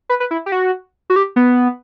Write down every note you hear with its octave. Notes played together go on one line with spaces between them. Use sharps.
B4
B4
E4
G4
F#4
F#4
G4
B3